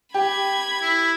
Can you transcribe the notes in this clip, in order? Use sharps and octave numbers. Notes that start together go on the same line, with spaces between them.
G4 B5 G#6
E4